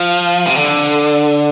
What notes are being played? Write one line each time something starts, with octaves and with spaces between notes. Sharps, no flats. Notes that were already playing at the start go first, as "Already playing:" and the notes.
Already playing: F3
C3
D3